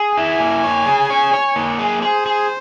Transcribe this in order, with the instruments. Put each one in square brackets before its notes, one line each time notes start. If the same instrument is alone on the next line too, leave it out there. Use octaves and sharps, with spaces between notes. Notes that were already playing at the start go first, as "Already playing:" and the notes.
Already playing: [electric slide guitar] G#4
[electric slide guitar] E4 [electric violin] G#5
[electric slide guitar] A#3
C#5
G#4
C#5
C#5
A#3
G#4
[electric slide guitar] G#4 [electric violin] C5
[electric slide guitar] G#4